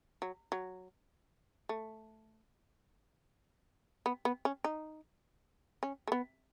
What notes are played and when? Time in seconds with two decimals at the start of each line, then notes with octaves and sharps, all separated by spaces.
0.22 F#3
0.52 F#3
1.69 A3
4.06 B3
4.25 B3
4.45 C#4
4.64 D#4
5.83 C#4
6.08 A3
6.12 B3